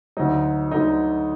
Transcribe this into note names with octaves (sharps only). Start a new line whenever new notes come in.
D2 D3 F#3 D#4
D2 D3 F#3 D#4